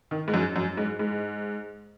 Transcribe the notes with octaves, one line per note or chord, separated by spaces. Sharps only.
D#3
G#2
F#2
F#2
G#2
G#2